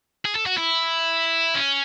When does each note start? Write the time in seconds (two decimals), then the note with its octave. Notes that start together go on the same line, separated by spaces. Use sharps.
0.25 G#4
0.35 A4
0.46 F#4
0.58 E4
1.55 C#4